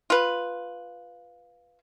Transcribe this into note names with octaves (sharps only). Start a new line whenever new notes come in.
F4 B4